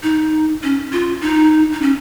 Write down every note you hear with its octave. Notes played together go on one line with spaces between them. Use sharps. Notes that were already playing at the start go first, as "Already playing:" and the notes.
D#4
C#4
F4
D#4
D#4
C#4